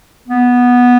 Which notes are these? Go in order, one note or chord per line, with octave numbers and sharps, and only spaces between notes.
B3